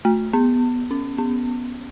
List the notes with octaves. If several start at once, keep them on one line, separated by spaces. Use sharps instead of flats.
A3
B3
C#4
B3